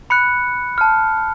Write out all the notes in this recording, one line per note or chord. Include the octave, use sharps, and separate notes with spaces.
B5 F#6 C#7
A5 F6